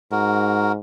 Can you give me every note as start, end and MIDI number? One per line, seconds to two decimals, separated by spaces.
0.12 0.80 44
0.12 0.72 66
0.12 0.72 70